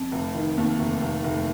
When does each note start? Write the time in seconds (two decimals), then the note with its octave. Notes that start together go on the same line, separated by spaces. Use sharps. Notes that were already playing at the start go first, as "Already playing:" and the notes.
Already playing: F2
0.12 F1
0.35 D#3
0.57 D#2
0.79 F1
1.01 F1
1.24 F1